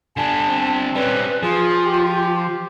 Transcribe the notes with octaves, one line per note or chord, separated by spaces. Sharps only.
D3 G3 G#5 A5
C4
G3 C#4 B4
F3 F4 G#4
G4